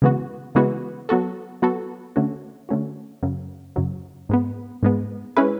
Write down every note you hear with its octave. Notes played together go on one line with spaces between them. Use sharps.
C#3 E3 G#3 B3 F#4
C#3 E3 G#3 B3 F#4
F#3 B3 F#4 A4
F#3 B3 F#4 A4
D3 A3 C#4 F#4
D3 A3 C#4 F#4
F#2 C#3 F#3
F#2 C#3 F#3
G#2 G#3 B3
G#2 G#3 B3
G#3 C#4 E4 G#4 B4